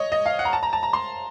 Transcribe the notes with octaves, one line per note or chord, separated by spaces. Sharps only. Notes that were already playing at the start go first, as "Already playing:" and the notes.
Already playing: C#5 D#5
D#5
F5
F#5
A#5
A5
A#5
A5
A#5
C6